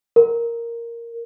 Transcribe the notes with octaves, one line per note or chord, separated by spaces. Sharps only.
A#4